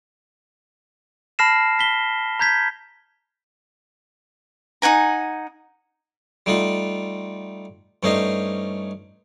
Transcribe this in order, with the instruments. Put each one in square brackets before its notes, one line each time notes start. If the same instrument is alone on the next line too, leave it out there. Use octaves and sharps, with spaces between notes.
[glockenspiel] A5 B5 F6 A#6 C7 E7
B6 G7
A#5 G6 G#6 B6
[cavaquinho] D#4 F#5 G#5 A#5
[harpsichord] G3 A3 D#4 F4 F#5
G2 A3 C#4 D#4 C5 D#5